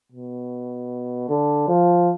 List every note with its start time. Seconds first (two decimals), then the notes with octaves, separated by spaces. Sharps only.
0.12 B2
1.29 D3
1.68 F3